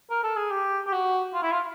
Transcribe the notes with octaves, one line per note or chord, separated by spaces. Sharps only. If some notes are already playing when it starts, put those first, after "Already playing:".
A#4
A4
G#4
G4
G4
F#4
F4
E4
F4